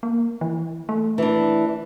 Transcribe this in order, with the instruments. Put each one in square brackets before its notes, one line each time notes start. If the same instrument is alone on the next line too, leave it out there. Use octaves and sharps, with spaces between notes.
[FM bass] A#3
E3
A3
[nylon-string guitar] E3 D4